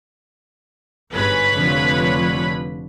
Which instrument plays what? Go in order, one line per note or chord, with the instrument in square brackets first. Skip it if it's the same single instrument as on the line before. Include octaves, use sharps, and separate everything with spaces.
[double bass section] G1 G#2 [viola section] B4 C#5 B5
[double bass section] F1 D3 F3